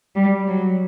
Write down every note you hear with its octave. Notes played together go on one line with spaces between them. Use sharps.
G3
F#3